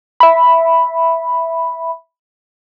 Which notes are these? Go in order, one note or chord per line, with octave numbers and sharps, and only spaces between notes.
E5 B5